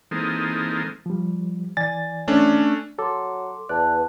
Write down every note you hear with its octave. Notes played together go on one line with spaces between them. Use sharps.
E3 G#3 A#3 C4 D#4 A4
F3 G3
E3 D5 G#5 A6
A3 C#4 D4
F#3 A4 C6 D6
E2 B4 D5 A5 F#6